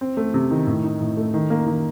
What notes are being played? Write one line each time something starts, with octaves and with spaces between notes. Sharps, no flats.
C4
A3
C3
D#3
A2
D#4
A2
A3
D#3
A#3
D#3